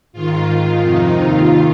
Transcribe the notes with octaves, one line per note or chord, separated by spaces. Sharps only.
G#2 D#3 F4
G#2 D#3
F2 C3 D#3 D#4
D#2 D#3 F4